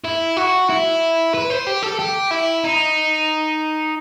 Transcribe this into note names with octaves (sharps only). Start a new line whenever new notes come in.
E4
F#4
E4
B4
C5
G4
A4
G4
E4
D#4